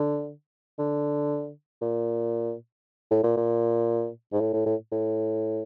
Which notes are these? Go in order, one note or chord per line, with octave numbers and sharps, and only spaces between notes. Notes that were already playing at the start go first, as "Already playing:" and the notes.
Already playing: D3
D3
A#2
A2
A#2
A#2
G#2
A2
A2
A2
A2